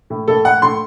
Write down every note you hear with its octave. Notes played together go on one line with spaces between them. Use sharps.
A2
A2 A4
A2 F#5
A2 C6